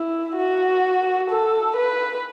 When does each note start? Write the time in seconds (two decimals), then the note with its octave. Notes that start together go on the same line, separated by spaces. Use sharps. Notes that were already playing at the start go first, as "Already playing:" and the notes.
Already playing: E4
0.37 F#4
1.30 A4
1.77 B4